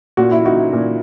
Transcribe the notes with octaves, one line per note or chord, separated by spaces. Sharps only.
A#2 F#4
E4
D#4 F#4
A#2